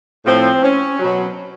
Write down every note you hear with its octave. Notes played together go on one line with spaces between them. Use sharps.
A2 F3 C4
C#4
B2 F#3